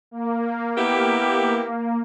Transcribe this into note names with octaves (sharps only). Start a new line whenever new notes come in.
A#3
B3 E4 G4